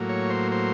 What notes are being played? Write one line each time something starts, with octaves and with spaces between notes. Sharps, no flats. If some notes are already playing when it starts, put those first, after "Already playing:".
Already playing: A2 F#3 A#3
C#5
C5
C5